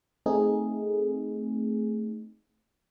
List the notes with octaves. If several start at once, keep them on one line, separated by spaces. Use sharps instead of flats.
A3 C4 D#4 G#4